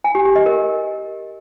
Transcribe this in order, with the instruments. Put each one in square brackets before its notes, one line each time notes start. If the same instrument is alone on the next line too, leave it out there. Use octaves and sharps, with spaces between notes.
[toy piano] G#5
G4
G4
D#5
A#4